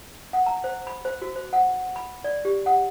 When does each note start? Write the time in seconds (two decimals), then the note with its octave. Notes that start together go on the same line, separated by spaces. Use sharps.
0.33 F#5
0.46 A#5
0.64 C5
0.87 B5
1.05 C5
1.22 F#4
1.36 C5
1.53 F#5
1.96 B5
2.24 D5
2.45 G4
2.66 F#5